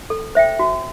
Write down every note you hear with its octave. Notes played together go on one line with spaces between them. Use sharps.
A4
C5 E5 G5
F#4